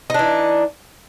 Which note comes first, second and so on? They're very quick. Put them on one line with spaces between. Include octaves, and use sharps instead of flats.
D#4 D4 E3